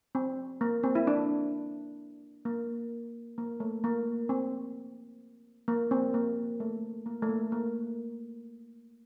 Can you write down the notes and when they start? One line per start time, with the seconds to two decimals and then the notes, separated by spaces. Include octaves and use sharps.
0.15 C4
0.61 A#3
0.84 C4
0.95 E4
1.07 D4
2.45 A#3
3.38 A#3
3.60 A3
3.84 A#3
4.29 C4
5.68 A#3
5.91 C4
6.14 A#3
6.60 A3
7.06 A#3
7.22 A3
7.29 A#3
7.52 A#3